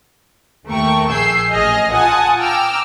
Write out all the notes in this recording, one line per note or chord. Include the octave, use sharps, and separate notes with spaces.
D#2 A3 A#4 G5 C#6
A#1 G#4 E6 G6 C7
A1 G#4 D#5 F6
F4 F#5 G#5 A5 D#6
G5 A#5 D6 E6 F6